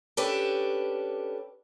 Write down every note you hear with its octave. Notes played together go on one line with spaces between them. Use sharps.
C#4 D4 G4 A4 B4